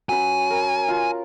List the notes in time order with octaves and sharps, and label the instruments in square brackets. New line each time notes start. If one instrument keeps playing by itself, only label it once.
[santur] F#3 C#4 B4 [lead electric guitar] G#5
[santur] A#4
F4